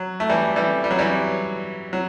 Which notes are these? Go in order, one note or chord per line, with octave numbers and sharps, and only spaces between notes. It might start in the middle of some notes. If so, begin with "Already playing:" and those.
Already playing: F#3
A3
E3 G3
E3 G3
G3
F#3
E3 G3
F#3